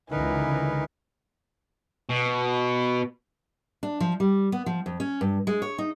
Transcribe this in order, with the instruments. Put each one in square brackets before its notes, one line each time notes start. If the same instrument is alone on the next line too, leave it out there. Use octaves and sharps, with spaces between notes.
[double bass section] C#2 [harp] D3 [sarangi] E3 [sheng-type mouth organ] D#4 A#4 B4
[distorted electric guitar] B2
[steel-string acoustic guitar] D4
F3
G3
B3
F3
F2
C#4
G2
G#3
C#5
D#4